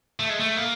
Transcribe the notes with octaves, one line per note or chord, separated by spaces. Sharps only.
A3
G#3
A3
A#3